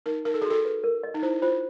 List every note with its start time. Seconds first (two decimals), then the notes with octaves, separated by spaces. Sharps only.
0.06 D#4 A#4
0.25 D#4 A#4
0.34 A4
0.42 G#4
0.45 F#4
0.50 A4
0.65 B4
0.84 A#4
1.03 D#5
1.14 D#4
1.23 E4 C5
1.42 F4 C5